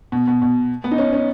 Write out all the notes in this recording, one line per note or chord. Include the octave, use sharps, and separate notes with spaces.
B2
B2
B2
B3
D#4
C#4
C#4